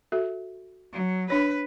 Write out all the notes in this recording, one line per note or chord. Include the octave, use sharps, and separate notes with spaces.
F#4 A4 E5
F#3
D4 B4 C#5